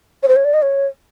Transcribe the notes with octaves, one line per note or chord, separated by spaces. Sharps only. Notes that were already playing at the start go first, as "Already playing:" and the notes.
C#5
C5
C#5
D5
D#5
C#5